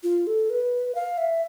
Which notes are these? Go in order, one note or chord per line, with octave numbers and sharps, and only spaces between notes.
F4
A4
B4
F5
E5